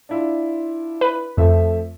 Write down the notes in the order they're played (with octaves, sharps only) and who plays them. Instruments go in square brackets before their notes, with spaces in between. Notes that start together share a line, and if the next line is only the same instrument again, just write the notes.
[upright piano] D4 E4 F4
[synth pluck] B4
[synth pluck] F2 [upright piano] F3 A3 E5